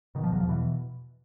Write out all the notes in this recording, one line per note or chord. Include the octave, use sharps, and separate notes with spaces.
B2 D#3
F3
E2 F#3
F3
B2 E3